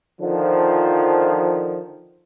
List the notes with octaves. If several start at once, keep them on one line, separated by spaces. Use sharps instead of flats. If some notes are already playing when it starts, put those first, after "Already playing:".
D3 D#3 F3